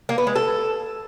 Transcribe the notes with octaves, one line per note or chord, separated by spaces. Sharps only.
A#3
B3
G#3
A4